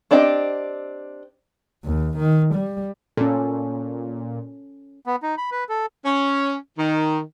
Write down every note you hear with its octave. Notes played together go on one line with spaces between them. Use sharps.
C4 D4 G4 D#5 G5
D#2
D#3
G3
A#2 C#4 A4
B3
D#4
B5
B4
A4
C#4
D#3